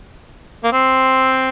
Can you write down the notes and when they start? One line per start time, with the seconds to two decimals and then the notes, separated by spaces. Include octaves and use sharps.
0.64 A#3
0.72 C4